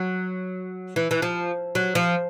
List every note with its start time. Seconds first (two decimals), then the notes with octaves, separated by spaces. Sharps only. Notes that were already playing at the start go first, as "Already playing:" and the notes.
Already playing: F#3
0.96 E3
1.11 E3
1.22 F3
1.75 F#3
1.95 F3